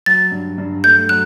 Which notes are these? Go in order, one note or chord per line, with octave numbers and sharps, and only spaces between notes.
F#3 A6
G2
G2
A3 G6
F#3 F#6